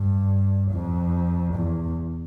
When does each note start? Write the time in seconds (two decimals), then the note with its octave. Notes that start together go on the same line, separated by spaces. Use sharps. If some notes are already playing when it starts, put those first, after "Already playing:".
Already playing: G2
0.72 F2
1.55 E2